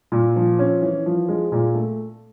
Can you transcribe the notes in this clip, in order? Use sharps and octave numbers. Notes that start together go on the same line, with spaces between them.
A#2
F3
C#4
E3
F3
G#3
A#2
A3